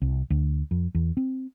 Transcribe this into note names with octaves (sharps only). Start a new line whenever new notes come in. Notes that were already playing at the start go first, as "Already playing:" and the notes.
C2
D2
F2
E2
C4